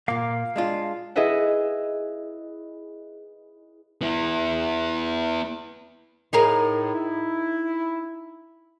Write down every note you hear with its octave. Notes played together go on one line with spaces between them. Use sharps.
A#2 A#3 F5 D6
G#3 D4 F4
E4 G#4 B4 D#5 E5 F#5
B3 E4
A2 D#4 G#4 A#4
E4